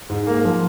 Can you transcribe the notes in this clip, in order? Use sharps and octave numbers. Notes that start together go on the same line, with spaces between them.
G#2
A#3
F3